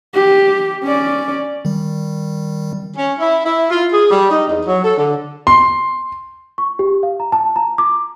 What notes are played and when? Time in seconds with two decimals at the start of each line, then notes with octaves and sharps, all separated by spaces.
0.14 G4
0.84 C#4 D5
1.65 D#3 G3
2.97 C#4
3.19 E4
3.44 E4
3.70 F4
3.92 G#4
4.09 G3
4.30 D#4
4.46 E2
4.65 F#3
4.84 A4
4.97 D3
5.47 C6
6.58 C#6
6.79 G4
7.03 F5
7.20 A#5
7.32 A5
7.56 A#5
7.78 D6